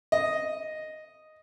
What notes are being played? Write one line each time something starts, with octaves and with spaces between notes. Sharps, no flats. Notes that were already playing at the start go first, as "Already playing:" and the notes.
D#5